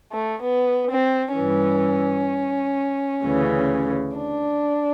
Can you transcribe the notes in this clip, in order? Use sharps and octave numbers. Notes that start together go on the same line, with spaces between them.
A3
B3
C4
G2 E3 C#4
D2 C#3 E3
D4